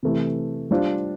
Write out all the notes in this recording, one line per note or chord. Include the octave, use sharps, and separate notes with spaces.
C3 E3 A3
G3 D4 F4 C5